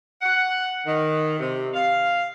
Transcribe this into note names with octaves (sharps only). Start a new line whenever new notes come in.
F#5
D#3
C3
F5